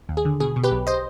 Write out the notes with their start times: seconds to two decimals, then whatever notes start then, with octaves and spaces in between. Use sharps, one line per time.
0.09 D#2
0.17 G#4
0.25 D3
0.40 B2 G#4
0.56 B2
0.64 G4 B4
0.71 B1
0.87 C5 D#5